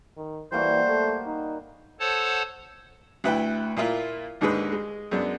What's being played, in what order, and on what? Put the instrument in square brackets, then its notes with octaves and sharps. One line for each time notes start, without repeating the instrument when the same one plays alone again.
[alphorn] D#3
[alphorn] E3 [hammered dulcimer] G3 A#3 F#4 [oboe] C5
[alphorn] A3
D#4
[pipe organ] A4 C5 C#5 F#5 A5
[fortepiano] D2 E4 B4 G5
A#2 A#3 E4 F4
D#2 G#2 D3 G#3 B4
G#3
F#2 G#3 B3 D4